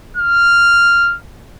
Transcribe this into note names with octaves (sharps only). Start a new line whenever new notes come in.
F6